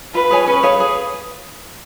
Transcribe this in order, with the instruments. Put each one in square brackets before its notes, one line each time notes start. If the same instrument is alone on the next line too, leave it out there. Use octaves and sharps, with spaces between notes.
[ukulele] F4 [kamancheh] B4
[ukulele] G#4 C#5 G#5
[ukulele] C#4 [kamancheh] B4
[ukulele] G#4 C#5 F5
G#4